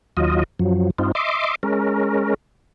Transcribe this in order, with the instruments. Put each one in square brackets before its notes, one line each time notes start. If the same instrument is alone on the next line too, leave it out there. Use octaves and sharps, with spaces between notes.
[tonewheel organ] D#2 F#3 F4 D#5
F#2 F3 F#3
G2 C4 D#4 F4
D#5 E5 C6 D6
G#3 C#4 A#4